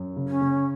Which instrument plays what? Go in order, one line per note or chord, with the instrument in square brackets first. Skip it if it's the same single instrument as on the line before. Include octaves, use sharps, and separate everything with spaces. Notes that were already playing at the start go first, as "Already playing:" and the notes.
Already playing: [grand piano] F#2
C#3
[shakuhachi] C#4
[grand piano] C#3